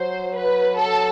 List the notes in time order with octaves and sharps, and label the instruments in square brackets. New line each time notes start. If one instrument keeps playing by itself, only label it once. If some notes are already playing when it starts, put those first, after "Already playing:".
Already playing: [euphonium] F#3 [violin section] C5
[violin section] B4
A4